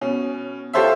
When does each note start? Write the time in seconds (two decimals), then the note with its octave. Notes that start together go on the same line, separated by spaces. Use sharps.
0.01 B2 C#4
0.73 F4 G4 A4 C5 C#5 E5